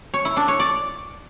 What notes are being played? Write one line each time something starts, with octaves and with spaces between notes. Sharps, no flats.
C#5
E4
D4
C#5
D5